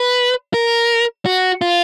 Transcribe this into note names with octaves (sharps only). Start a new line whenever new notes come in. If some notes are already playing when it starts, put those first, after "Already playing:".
Already playing: B4
A#4
F#4
F4